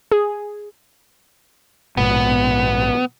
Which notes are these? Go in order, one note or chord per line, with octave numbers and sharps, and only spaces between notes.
G#4
A#1 G#2 B2 B3